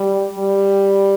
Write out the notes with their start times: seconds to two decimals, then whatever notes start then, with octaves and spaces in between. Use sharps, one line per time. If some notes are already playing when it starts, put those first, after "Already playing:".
Already playing: G3
0.39 G3